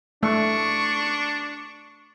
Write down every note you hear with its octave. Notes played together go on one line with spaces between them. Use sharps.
A3 D4 C#6